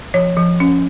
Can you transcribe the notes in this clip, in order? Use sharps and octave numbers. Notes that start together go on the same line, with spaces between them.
F3 C#5
F3
C#4